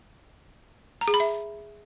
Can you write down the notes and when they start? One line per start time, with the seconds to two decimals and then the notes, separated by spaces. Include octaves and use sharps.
1.01 A#5
1.08 G#4
1.14 B5
1.20 E5